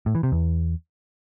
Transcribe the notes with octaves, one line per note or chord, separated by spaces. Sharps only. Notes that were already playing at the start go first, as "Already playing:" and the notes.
A2
E3
C3
E2